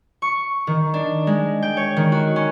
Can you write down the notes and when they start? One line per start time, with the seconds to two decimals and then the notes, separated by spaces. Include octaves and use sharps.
0.22 C#6
0.67 D#3
0.94 D4
1.27 G#3
1.62 G5
1.77 C#5
1.96 D#3
2.12 F#4
2.36 C#4